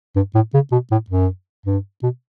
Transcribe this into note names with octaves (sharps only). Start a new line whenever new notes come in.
G2
A2
C#3
B2
A2
F#2
G2
B2